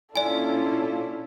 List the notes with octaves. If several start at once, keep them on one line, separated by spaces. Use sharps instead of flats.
A#2 C#4 D4 E4 F4 A4 D5 G#5